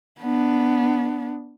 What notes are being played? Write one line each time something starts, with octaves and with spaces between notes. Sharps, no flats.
B3 D4